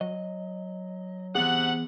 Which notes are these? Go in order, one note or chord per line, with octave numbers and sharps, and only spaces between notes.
F#3 D#5
C3 E3 B3 G#4 F#5